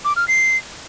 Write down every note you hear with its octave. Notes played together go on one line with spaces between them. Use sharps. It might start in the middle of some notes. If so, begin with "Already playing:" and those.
D6
F6
C7